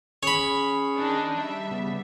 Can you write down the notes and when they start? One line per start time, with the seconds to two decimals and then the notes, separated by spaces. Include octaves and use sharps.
0.23 C#4 G#4 C#5 B5
0.97 D#3 D4 D#4
1.37 G3 E5
1.71 C#3 B3